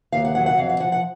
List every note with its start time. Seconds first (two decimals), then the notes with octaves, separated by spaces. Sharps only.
0.12 D#2 F5
0.25 F#5
0.35 F#3 F#5
0.46 F#5
0.58 F2 F5
0.69 F5
0.80 F3 F#5
0.92 F#5